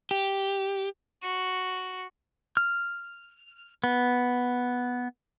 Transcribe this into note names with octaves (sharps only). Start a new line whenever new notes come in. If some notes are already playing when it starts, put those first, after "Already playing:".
G4
F#4
F6
B3